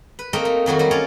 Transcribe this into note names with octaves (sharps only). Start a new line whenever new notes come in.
B4
A3 A#3 C4 D#4 A#4 G5
D#4
F2 D#3 F#3 F#4
F#3 G3 F#4
C#4 F4 A#4 C#5 D5 A#5